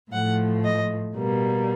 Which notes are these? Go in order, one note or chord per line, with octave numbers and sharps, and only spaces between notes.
A2 F3 A3 F#5
D#5
B2 G3 A#3